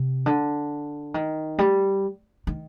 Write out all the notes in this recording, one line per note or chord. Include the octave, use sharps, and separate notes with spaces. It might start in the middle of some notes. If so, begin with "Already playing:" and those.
Already playing: C3
D3
D#3
G3
D#3